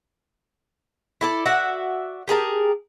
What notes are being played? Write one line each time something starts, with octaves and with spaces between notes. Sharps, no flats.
E4 A4 D5
F#4 D5 E5 F#5
G4 G#4 A#4 A5